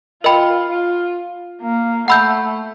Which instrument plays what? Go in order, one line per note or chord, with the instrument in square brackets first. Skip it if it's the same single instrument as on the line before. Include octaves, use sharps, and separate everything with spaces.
[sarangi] F4 [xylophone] A#4 D#5 G5 B5
[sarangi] F4
A#3
[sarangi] A3 [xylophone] F#5 B5 E6 G6